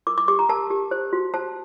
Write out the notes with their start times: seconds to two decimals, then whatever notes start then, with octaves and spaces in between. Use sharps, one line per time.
0.07 A#4 D6
0.18 D6
0.28 G4 D6
0.39 A#5
0.49 A#4 A5
0.70 G4
0.91 C5
1.13 F#4
1.34 C5 A5